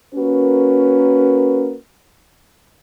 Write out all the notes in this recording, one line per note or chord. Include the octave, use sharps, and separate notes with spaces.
A#3 C#4 F#4 A#4 B4